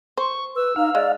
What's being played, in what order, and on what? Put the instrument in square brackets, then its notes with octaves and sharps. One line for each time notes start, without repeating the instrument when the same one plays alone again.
[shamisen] C5 [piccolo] C#6
[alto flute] B4 [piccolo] E6
[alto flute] D#4 [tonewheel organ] F5
[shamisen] G#3 [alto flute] D5